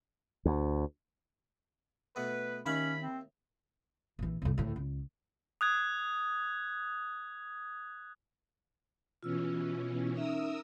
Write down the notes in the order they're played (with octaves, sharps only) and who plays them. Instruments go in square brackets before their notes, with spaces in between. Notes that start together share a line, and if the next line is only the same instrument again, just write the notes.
[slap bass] D2
[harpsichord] B2 A3 B3 [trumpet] B4
[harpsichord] D#2 E5 F5 [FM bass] D#3 [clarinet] C#4 [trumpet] B5
[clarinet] C4
[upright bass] A#1 E3
C2 F2
D2 A2
C#2
[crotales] D#6 F#6 G#6
[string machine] B2 E3 C#4 [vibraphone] F4 E6
[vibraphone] C#4 D#4 E5 [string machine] A#4 D#6 E6